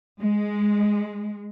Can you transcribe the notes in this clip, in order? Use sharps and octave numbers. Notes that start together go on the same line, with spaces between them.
G#3